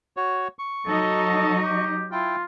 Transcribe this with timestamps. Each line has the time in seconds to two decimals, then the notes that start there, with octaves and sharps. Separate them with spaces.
0.17 F#4 C#5
0.59 C#6
0.87 F#3 D#4 A4 D#5
1.65 G4
2.12 E4 F4 G5